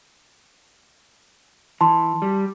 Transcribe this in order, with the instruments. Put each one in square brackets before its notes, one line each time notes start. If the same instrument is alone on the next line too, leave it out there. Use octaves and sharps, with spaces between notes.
[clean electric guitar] E3 [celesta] A5 C6
[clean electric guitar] G3